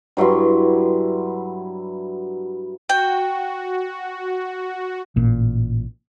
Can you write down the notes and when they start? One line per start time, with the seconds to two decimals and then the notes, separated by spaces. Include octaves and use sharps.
0.17 G2 F#3 E4 C6
2.89 F#4 G5
5.16 A1 A#2